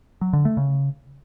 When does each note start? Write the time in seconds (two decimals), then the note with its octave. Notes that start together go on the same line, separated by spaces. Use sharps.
0.21 F#3
0.33 D3
0.45 A3
0.57 C#3